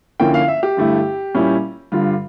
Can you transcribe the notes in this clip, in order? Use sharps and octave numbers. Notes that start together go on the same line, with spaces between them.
D3 F3 A#3 C#4 E4 G5
F5
E5
G4
G2 D3 A3 E4
A#2 G3 C#4 E4
G2 D3 G3 F4